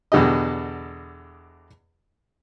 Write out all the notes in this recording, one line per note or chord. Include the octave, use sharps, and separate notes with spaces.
E2 B2 D3 G4 D#5